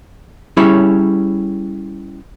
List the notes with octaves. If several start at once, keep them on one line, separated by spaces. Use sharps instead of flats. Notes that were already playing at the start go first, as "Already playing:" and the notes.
G3 C#4 E4 G#4 C#5